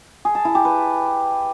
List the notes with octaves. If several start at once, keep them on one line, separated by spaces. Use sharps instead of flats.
G#4
A5
E4
G4
B4